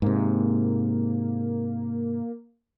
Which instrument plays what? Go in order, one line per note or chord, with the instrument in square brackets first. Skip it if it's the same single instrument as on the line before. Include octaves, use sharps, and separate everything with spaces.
[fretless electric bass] G#2 C3 [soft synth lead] A#3